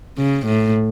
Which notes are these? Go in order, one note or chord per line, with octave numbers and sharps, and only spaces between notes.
C#3
A2